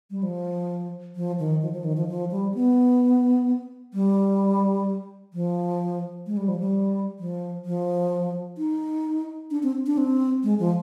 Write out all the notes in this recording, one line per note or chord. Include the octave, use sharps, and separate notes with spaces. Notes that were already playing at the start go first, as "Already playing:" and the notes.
G3
F3
F3
D#3
F3
F3
D#3
F3
F3
G3
B3
G3
F3
G#3
G3
F3
G3
F3
F3
D#4
D4
C4
D4
C4
G#3
F3